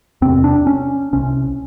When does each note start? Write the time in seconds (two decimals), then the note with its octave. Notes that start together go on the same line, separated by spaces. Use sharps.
0.22 E2 C3 C4
0.44 D4
0.67 C#4
1.13 C2 C3 C#4